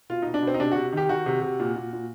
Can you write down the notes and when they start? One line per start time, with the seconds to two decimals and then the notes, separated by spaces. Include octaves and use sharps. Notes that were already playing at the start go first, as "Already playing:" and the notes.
0.10 B2 F4
0.22 B2 D#4
0.34 D4
0.42 B2
0.47 C4
0.54 D#4
0.60 C3 D4
0.72 C3 F#4
0.93 D#3 G4
1.09 D#3 F#4
1.26 C3
1.42 C3
1.60 A#2
1.76 A#2
1.93 A#2